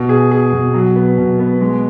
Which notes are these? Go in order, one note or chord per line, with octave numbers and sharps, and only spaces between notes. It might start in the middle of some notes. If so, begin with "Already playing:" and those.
Already playing: B2
G#4
G#4
B2
F#3
B3
B2
B3
G#3